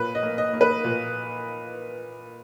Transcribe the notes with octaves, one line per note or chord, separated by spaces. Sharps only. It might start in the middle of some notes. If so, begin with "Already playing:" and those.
Already playing: A#2 B4
D#5
A#3
D#5
A#3
B4
A#2